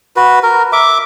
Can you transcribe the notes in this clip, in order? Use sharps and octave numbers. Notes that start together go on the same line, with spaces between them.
F#4 B4
A#4
E5 D6